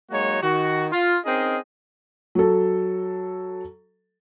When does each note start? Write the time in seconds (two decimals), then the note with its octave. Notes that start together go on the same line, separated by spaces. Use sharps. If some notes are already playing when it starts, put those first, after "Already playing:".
0.11 F#3 G#3 A#3 D#4 F#4 C#5
0.42 D#3 F#4
0.91 F4
1.25 C4 C#4 D#4 G#4 A#4 D#5
2.35 F#3 A4